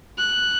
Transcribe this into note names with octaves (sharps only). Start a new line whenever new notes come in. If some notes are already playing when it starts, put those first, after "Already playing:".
F#6